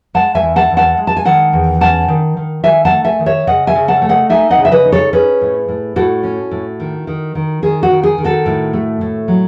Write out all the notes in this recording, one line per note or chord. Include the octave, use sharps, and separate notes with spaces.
G#3 F#5 A5
E5 G#5
E2
F#5 A5
E2
F#5 A5
G#3
A5
G#5
D#3 F#5 A5
E2
C#4 F#5 A5
D#3
D#3
D#3 E5 G#5
F#5 A5
A3
E5 G#5
D#3
C#5 E5
C#3 D#5 F#5
E5 G#5
C#3
F#5 A5
A3
D#5 F#5
D#4 E5 G#5
D#5 F#5
C#3
E5
B4 D#5
D#4
A4 C#5
C#4 G#4 B4
A2
A2
A2 F#4 A4
C#4
A2
D#3
D#3
D#3
D#3 G#4
F#4
D#3
G#4
D#3
F#4 A4
A2
A3
A2
F#3